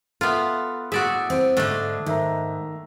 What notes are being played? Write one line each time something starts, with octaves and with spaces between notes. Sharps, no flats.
B3 F4 A4 E5 F#5
A2 F#4 G#4 D5 E5
B3 C4
G#2 D3 A3 D4
G#2 D#3 E5 A#5